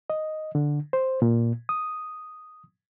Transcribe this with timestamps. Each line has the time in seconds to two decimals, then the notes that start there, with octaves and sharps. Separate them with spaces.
0.10 D#5
0.55 D3
0.93 C5
1.22 A#2
1.69 D#6